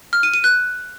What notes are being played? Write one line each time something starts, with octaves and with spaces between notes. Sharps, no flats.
F6
D#7
D#7
F#6